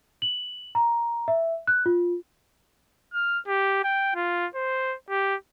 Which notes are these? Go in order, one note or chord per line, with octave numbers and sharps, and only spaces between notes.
F#7
A#5
E5
F#6
F4
F6
G4
G5
F4
C5
G4